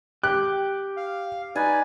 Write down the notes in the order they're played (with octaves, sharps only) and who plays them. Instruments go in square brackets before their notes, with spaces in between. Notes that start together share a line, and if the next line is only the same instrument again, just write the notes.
[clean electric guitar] G4 [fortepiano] F#6
[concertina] F5
[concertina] D#4 B4 D5 [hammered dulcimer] G#5